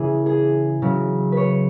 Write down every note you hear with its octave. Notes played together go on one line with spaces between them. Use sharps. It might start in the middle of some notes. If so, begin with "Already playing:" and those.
Already playing: C#3 E3 G#4
G#4
C#3 F#3
B4 C#5